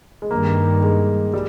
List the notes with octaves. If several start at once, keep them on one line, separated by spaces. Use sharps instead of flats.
G#3
G2 D#3 G3 A#3
G#3
G3